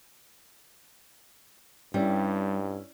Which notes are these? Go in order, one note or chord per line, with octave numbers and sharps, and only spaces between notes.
G2 G3 C#4 E4